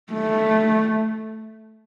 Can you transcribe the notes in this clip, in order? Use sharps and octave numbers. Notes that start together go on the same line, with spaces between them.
A3